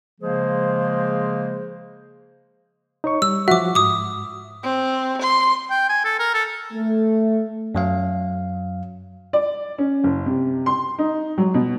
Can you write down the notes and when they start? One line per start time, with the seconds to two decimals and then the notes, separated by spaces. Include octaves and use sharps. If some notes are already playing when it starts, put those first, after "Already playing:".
0.21 C#3 F3 G#3 A#3 G#4 C5
3.04 D#4 C#5 C#6
3.22 G3 E6
3.48 F3 F#4 E5 D6
3.75 G#2 D6 D#6
4.63 C4
5.23 C6
5.70 G5
5.89 G#5
6.04 A4
6.19 A#4
6.34 A4
6.73 A3
7.75 F#2 F#3 F5
9.33 D5
9.78 C#4
10.04 F#1
10.26 C3
10.66 C6
10.98 D#4
11.38 F#3
11.54 B2